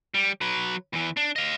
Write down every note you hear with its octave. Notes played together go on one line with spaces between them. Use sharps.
G3
F#3 B4
E2 E3
D4
D#5 F5